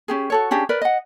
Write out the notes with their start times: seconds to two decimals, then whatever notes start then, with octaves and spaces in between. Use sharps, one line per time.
0.08 C#4 G4 G#4
0.30 F#4 A4 C#5
0.51 C#4 D4 G4 G#4
0.69 A#4 B4 D5
0.82 D#5 F#5